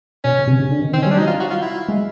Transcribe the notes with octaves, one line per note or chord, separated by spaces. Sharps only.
B2 C#4
C#3
C3
C#3
D3
D#3
D#3 C4
C#4
G3
D4
F#3 D#4
F4
F#4
F4
E4
G#3